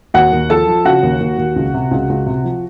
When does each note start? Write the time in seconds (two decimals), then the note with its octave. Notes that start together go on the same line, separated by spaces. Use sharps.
0.14 D#2 F#4 F#5
0.33 D#2
0.50 F3 A4 A5
0.67 F3
0.85 C#3 F#4 F#5
1.03 D#2
1.20 D#2
1.38 D#2
1.56 C#2
1.74 C3
1.91 C#2
2.09 C#2
2.26 C3
2.44 F3